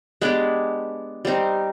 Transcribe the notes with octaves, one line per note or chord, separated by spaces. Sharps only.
G#3 B3 D4 G4
G3 C4 D#4